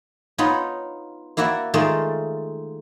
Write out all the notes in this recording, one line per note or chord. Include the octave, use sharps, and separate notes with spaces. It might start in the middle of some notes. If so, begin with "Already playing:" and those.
B3 D#4 F4 C#5 B5
A#3 E4 F#4 D5 E5
D#3 G#3 A3 D#4 F4 D5